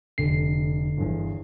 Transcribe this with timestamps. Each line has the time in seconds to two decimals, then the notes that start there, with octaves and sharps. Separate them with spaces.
0.18 F1 D3 C7
0.97 G1 E2